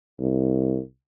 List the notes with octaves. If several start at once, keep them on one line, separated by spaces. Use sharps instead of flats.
C2